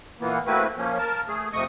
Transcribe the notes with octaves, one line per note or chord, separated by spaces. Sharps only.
A#2 E3 A#3 B3
A3 A#3 C4 E4 F#4 B4
F3 A#3 C#4
A#4 A5
A3 G#4
F2 C3 A3 D#5 C#6 D#6